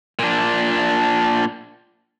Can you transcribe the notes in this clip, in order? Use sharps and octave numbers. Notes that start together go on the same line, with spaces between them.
A#2 D4